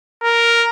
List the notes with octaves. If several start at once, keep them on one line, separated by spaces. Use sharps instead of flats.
A#4